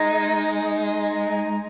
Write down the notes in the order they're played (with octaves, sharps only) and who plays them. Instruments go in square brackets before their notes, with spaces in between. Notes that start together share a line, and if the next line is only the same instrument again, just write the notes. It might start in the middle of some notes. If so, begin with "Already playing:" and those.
Already playing: [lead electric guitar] G#3 [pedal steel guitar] D#4